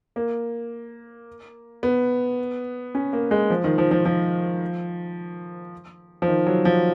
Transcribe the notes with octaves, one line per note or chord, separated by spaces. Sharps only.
A#3
B3
C#4
A#3
G#3
F3
D#3
F3
F3
F3
F3
D#3
F#3
F3